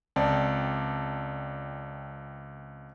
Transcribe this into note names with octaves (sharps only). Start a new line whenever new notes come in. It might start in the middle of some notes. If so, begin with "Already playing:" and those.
C#2 C4 D5 A5